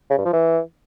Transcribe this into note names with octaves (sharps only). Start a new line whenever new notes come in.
C#3
G2
F3
E3